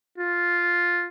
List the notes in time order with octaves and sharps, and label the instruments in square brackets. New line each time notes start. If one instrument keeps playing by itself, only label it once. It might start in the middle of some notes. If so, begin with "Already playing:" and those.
[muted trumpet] F4